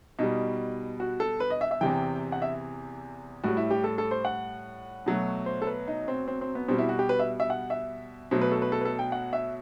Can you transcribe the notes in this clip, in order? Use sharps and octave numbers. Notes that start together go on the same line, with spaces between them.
B2 G3 D#4
F#4
A4
B4
D#5
E5
E5
E2 C3 E3 G5
F#5
E5
A2 G3 F#4
E4
G4
A4
A4
C5
F#5
B2 F#3 A3
C5
A4
B4
D#4
C4
C4
C4
B3
B2 G3 C4
E4
F#4
G4
B4
E5
E5
F#5
E5
B2 F#3 A3 C5
B4
A4
B4
A4
B4
A4
G5
F#5
E5